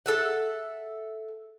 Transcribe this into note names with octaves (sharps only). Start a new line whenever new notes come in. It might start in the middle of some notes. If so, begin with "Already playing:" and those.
A4 E5 F#5